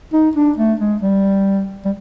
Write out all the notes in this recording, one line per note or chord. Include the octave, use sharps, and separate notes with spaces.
D#4
D4
A3
G#3
G3
G3